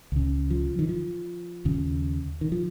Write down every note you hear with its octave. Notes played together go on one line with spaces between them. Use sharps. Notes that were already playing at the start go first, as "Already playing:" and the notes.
C#2 C#3
F3
D#3
F3
D#2 C#3
D#3
F3